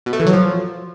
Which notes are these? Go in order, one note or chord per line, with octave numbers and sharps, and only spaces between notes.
B2
A3
E3
F#3
F3